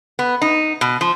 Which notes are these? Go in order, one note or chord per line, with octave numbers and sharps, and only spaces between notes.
B3
D#4
B2
F3